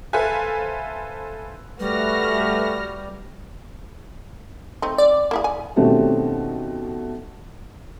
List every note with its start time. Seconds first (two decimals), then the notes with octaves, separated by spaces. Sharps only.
0.13 A4 B4 C5 E5 F5 G#5
1.80 G3 A3 F#4 B4 F6 A#6
4.82 A3 C4 D#4
4.98 D5
5.31 A#3 E4 G#4
5.44 G#5
5.76 B2 D#3 G3 A3 C4 C#4